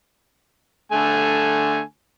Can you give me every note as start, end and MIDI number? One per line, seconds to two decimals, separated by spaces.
0.92 1.80 50
0.92 1.80 57
0.92 1.80 80